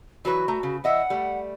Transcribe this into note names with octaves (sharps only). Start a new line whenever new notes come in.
E3 F#3 F#4 B4
A3 A#5
C#3
E3 D#5 E5 F#5
G3 A3